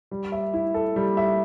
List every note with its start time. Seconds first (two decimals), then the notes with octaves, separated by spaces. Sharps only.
0.11 G3
0.32 E5
0.53 E4
0.74 A4
0.96 G3
1.17 E5